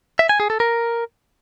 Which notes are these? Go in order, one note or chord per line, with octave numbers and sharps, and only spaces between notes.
E5
G#5
G#4
A4
A#4